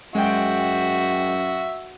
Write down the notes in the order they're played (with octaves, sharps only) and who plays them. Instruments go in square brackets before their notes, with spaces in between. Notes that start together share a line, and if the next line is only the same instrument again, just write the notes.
[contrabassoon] F#2 [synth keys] G#3 G5 [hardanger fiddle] F#4 [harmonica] E5